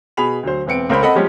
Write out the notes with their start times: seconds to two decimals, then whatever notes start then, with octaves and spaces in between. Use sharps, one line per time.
0.17 B2 G#4 B5 F7
0.43 D2 F#3 C5
0.66 E1 B3 C4 C#7 D7
0.89 C#2 A#4 C5 B5
1.02 C4 A4 D#5 F#5 B5
1.15 F3 G3 G#3 C#4 G4